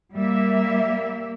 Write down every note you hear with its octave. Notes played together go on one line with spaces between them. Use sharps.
G3 A#3 E5